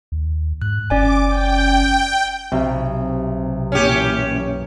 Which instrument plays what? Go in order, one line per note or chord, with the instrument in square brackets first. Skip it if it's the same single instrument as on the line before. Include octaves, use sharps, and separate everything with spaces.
[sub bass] D#2
[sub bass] G#2 [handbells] F#6
[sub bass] F#1 [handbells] C#4 D5 G#5 [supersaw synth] D6
[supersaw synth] G5
[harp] B1 [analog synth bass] C3
[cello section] F#2 A#2 E3 [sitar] C#4 G4